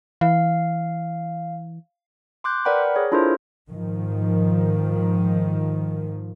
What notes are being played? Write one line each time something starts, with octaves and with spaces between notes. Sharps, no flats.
E3 F5
C6 D6 F#6 G6
A#4 B4 D5 F#5 G5 B5
G#4 C#5
D4 E4 F4 A4 A#4 C5
G#2 D#3 F3